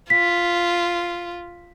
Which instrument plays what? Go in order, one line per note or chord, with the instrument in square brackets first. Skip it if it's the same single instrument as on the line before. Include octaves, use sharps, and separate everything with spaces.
[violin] F4 [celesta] B6